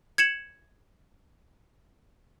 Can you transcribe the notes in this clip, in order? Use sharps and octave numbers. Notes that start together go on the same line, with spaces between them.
G#6 C#7 E7 F#7